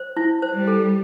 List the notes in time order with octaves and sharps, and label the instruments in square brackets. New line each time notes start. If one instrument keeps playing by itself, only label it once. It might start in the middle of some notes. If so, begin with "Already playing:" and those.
Already playing: [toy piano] C5
E4
C5
[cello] G3
[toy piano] A4